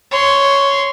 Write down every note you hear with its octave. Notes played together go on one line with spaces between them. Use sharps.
C#5 C6